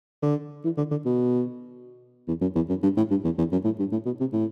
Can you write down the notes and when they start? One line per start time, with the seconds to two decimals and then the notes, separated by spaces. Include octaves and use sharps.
0.23 D3
0.64 E3
0.77 D3
0.91 D3
1.06 B2
2.28 E2
2.41 F#2
2.55 E2
2.69 F#2
2.83 G2
2.97 A2
3.11 G2
3.24 E2
3.38 E2
3.52 F#2
3.64 A2
3.79 G2
3.92 A2
4.05 B2
4.20 C3
4.33 A2